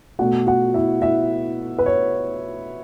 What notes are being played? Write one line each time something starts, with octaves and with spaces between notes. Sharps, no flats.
B2 A3 F#4 F#5
F#4 F#5
E4 E5
E4 E5
B4
C#5